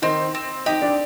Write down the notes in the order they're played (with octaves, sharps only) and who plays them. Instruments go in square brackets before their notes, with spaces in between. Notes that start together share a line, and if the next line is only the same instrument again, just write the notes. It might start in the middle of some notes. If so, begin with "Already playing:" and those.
[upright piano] D#3 D#4 [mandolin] C4
[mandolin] C4
[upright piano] D#4 D#5 [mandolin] G4
[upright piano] D4 D5